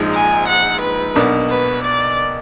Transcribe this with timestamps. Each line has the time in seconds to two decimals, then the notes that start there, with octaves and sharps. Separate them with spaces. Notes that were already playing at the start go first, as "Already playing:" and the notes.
Already playing: A#1 G#2 F3 G#3 D#4
0.14 G#5
0.48 F#5
0.81 B4
1.15 B1 B2 A#3 D4
1.49 B4
1.83 D5